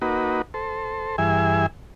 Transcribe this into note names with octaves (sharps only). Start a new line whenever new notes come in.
A#3 D#4 F#4 B4
A4 C5
G2 E3 G#4 E5 G#5